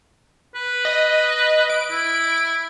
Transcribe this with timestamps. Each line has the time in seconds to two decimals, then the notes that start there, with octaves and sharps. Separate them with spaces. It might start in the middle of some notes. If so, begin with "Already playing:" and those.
0.55 B4
0.85 D#5
1.70 D7
1.91 E4